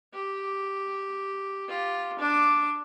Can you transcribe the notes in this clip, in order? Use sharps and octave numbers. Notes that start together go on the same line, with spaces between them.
G4
F4 G4
D4 D6